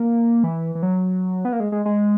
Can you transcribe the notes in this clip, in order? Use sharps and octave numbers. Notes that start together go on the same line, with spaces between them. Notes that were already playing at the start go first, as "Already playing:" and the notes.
Already playing: A#3
E3
E3
F#3
B3
A#3
G#3
G#3
G#3